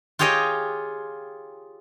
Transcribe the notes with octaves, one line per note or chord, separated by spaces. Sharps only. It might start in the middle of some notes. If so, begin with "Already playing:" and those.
F4 G4 G#4 C#5 D#5 G5